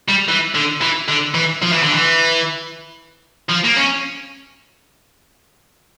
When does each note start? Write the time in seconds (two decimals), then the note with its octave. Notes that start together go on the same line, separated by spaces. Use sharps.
0.08 G3
0.29 E3
0.55 D3
0.81 E3
1.09 D3
1.34 E3
1.62 F3
1.72 E3
1.83 D3
1.94 E3
3.49 F3
3.64 A#3
3.76 C#4